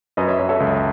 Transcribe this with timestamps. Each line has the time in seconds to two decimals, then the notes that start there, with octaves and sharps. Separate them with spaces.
0.17 F#2 B4 D#5
0.28 C#5 E5
0.39 F#2 C#5 E5
0.49 A4 C#5
0.60 C#2